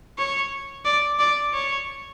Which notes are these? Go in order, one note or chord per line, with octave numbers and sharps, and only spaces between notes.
C#5
D5
D5
C#5